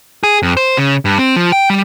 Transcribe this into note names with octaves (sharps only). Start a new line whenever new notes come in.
G#4
F2
C5
C#3
G2
C4
F3
G5
G3